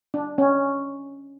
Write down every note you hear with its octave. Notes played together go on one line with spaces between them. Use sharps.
D4
C#4